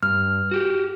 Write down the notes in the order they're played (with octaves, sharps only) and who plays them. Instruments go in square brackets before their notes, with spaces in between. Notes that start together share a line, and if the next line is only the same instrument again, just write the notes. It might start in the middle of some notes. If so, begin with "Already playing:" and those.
[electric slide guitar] G2 [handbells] F6
[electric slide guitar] F#4 G4